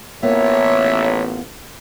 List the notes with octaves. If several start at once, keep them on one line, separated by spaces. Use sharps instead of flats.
A1 A#3 B3 F4 C#5 E5